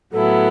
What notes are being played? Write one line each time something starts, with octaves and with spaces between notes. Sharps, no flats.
A2 F#3 B3 E4 A4